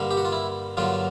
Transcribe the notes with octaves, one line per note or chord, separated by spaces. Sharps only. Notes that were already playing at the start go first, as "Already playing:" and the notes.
Already playing: G2 D3 G3 A#3
G4
F#4
F4
E4
G2 D3 F#3 A#3 F4